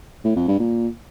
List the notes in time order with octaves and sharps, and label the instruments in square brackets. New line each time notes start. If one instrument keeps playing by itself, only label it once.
[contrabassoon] A2
F2
G2
A#2